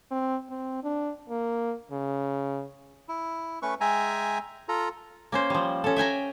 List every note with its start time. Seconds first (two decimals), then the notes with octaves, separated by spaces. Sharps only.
0.11 C4
0.50 C4
0.84 D4
1.30 A#3
1.91 C#3
3.08 E4
3.62 A3 C#4 B4 C#6
3.81 G#3 E5 G5 G#5 A#5
4.69 F4 A4 A#5
5.32 A#3 C#4 C5
5.50 F3 G3
5.84 C#4 A4
5.96 E5 G5 G#5 A#5